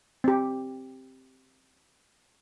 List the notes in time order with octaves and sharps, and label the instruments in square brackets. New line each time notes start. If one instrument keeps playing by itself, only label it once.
[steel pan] C4 G4